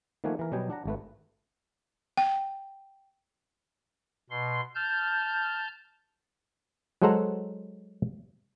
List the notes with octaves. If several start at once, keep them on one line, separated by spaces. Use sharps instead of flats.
D#3 F3 A3 A#3 F#5 G#5
E3 A#4
B2 F#3 G3 B3 G5 G#5
D4 F#5 A#5
G#1 A3 B4
G5
B2 C6
A5 F6 G6
F#3 G#3 A4 C5 F#5 A#5